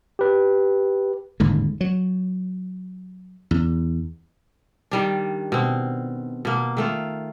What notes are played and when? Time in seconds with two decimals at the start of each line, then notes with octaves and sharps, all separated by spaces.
0.19 G4 B4
1.40 D#1 G#2 D3
1.81 F#3
3.51 E2
4.91 D#3 G3 D4
5.52 B2 C4
6.45 B2 A#3
6.77 D#3 A3 F4